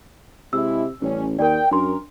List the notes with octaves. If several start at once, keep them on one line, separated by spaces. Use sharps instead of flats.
C3 G#3 E4 E6
A1 G3 C#4
D#2 A#4 D5 G5
F#2 D4 A#4 C6